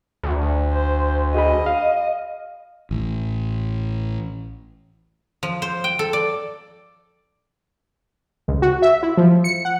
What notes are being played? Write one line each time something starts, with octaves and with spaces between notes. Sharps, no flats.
D2
C5
F#4 G#4 D#5 B5
F5
A1
F3
C5
G5
A4
D5
C#2
F#4
E5
E4
F3
C#7
F#5